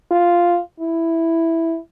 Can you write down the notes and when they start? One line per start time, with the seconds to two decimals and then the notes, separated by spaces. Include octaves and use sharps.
0.11 F4
0.80 E4